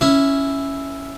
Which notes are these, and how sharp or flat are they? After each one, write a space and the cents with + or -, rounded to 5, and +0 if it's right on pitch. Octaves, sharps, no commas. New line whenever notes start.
C#4 +0 E4 +0